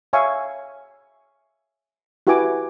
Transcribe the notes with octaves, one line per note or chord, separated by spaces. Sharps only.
C#5 E5 F5 G#5 C#6
E4 F#4 G4 B4 G#5 D6